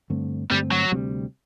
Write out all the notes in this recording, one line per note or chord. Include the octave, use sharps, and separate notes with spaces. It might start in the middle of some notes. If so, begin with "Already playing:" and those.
G2 D3 A3 C4
G2 D3 G3 A3 C4
F#3
D2 C3 G3 C4